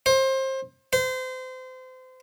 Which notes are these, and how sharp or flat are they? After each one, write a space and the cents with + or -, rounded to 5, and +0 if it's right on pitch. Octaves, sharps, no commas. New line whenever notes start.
C5 +25
C5 -30